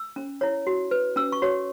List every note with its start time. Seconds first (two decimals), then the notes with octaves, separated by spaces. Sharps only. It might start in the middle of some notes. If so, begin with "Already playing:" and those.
Already playing: E6
0.16 C#4
0.41 E4 C#5
0.67 F#4
0.91 B4
1.16 C#4 E6
1.32 C#6
1.42 F#4 C#5